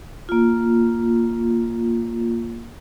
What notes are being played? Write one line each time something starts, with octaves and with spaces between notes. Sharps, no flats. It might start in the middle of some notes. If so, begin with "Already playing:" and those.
A#3 F4